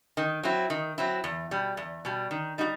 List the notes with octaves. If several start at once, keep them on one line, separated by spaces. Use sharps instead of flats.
D#3
F#3 C4 E4
D#3
F#3 C4 E4
E2
B2 G3
E2
B2 G3
D#3
G3 D#4 F#4